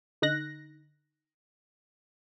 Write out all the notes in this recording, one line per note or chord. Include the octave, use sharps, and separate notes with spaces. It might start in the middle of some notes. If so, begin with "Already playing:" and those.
D3 D#4 F#6 A#6